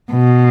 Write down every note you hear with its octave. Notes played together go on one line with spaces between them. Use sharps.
B2